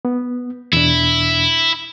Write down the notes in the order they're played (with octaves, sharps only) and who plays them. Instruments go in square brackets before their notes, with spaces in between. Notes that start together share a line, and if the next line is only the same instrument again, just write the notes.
[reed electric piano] B3
[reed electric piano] E2 B2 D4 [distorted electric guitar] E4